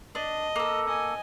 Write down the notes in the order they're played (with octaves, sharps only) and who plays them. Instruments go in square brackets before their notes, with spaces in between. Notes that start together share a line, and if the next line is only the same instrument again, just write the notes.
[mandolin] D4 [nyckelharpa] D#5
[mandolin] A#3 A4
[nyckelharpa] D#5 G#5